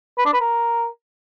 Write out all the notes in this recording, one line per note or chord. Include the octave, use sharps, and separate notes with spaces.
B4
D4
B4
A#4